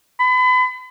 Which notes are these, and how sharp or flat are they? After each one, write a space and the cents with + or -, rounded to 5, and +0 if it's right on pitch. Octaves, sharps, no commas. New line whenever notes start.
B5 +35